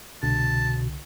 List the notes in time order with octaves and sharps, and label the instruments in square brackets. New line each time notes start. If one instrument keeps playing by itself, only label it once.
[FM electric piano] C2 D3 [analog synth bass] B2 [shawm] A5